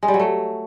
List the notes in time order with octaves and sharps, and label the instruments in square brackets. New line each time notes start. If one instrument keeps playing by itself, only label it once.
[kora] G#3
G3
F#3
A3